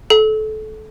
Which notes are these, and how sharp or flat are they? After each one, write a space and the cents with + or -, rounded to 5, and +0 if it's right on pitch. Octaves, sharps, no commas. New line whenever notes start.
A4 -25